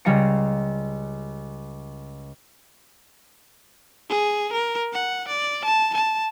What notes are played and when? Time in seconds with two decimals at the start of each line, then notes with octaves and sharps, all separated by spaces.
0.05 C#2 G3 C#4 F5 A#5 C#7
4.10 G#4
4.53 A#4
4.93 F#5
5.28 D5
5.65 A5
5.94 A5